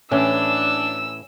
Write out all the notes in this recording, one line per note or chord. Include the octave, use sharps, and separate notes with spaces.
A2 E3 C#4 D4 E6